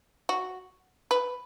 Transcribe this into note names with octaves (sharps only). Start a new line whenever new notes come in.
F#4
B4